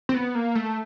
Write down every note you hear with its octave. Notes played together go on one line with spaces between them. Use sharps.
C4
B3
A#3
A3